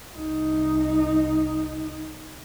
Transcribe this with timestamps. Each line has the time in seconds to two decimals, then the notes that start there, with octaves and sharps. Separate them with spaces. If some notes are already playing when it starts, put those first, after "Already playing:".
0.14 C2 D#4